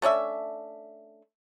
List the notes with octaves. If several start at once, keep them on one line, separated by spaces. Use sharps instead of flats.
A3 C#4 D4 E5